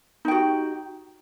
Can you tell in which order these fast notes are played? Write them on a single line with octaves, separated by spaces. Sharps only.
D#4 G5 F#4 G4